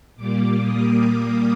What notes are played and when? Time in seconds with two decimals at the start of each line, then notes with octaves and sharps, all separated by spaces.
0.16 A#2 G3 A#3 D6
0.61 D#6
1.06 D#6